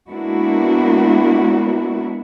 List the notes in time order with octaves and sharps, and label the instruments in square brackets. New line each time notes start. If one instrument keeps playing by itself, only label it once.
[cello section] G#3 A#3 B3 D4 E4 F#4